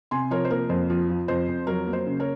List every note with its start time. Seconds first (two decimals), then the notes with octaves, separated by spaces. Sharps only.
0.11 C3 G#5 C6
0.31 F3 A#4 C#5
0.45 C5
0.50 A#3 A#4
0.69 F2 C5
0.90 F3
1.09 F3
1.28 F2 C5
1.48 F2
1.67 F#3 A#4
1.87 A#3
1.93 C5
2.06 C#3
2.20 A#4 C#5